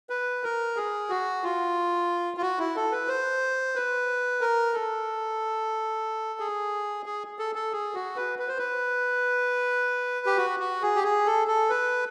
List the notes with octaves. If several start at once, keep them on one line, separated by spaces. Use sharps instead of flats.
B4
A#4
G#4
F#4
F4
F4
F#4
E4
A4
B4
C5
B4
A#4
A4
G#4
G#4
A4
A4
G#4
F#4
B4
B4
C5
B4
G4
F#4
F#4
G#4
G4
G#4
A4
A4
B4